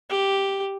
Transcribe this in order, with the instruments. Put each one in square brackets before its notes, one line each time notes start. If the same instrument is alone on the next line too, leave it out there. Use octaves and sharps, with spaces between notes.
[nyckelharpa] G4